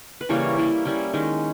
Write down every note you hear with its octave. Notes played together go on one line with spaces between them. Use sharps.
B4
C#3 E3 G3 A#3 C#5
G3 A#3 E4
G3 C#4 E4
D#3 G#3 C#4